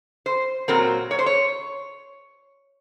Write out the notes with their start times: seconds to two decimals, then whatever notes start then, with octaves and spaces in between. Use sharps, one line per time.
0.26 C5
0.68 A#2 F#3 C4 A#4
1.11 C#5
1.19 C5
1.26 C#5